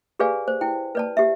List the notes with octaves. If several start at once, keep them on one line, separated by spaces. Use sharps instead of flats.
G4 G#4 B4 D5 F5 G#5
C5
E4 G5
B4 D5 A5
G4 E5